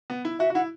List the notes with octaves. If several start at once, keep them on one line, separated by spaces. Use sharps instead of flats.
B3
E4
F#4 E5
F#4
E4 F#5